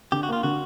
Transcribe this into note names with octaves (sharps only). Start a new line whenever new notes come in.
D3 G4
F#4
A#3 F4
D3 F#4